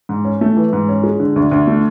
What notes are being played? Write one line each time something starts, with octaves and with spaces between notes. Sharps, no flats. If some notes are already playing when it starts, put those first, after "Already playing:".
G#2
C#4
A3
E3
G#2
C#4
G#3
D3
D2
D2
A3